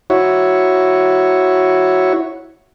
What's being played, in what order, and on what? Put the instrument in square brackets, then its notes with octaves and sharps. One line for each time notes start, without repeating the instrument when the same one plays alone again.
[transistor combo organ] E4 F#4 C#5